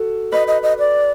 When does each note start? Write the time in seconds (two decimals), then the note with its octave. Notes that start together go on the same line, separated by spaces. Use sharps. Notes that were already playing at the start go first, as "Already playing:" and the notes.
Already playing: F#4 A4
0.32 B4 D#5
0.48 D#5
0.63 D#5
0.79 D5